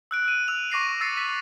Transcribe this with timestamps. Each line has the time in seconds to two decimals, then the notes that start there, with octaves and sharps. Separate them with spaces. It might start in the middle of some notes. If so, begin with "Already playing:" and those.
0.11 E6 F#6 D7
0.28 D#7
0.48 E6 F7
0.70 C#6 D6 A#6 C7 D#7
1.01 E6 A6 C7 C#7
1.17 B6